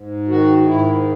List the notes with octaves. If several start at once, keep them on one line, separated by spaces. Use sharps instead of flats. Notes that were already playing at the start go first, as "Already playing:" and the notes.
Already playing: G#2
D#3 F#4
G#2 E4